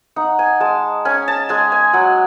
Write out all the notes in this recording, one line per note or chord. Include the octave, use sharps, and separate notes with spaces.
D#4 F#5
G#5
G#3 A5
C#4 G#5
A5
G#3 G#5
G#5
F#3 F#5